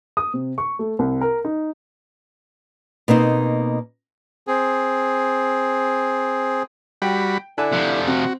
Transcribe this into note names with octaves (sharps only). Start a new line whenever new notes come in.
D#6
C3
C#6
A3
C2
A#4
D#4
B2 A#3 C4 D#4
C4 G#4
G3 F#4 G5 B5
D3 E4 G#5 A5 F#6
C3 F3 F#6
C4 F#4